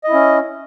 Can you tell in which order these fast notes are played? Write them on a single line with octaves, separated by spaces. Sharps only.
D#5 E4 C#4